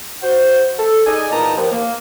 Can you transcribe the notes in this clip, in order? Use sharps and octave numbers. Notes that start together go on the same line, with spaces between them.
F#4 C5
A4
D#4 G#4 D5 D#5 G#5
E2 A#2 D#4 D#5 A5 A#5
D#2 F3
A#3